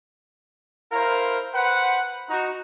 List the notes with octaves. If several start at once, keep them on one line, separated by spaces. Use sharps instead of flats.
E4 A#4 C5 F5 A#5
B4 C5 F#5
D#4 F#4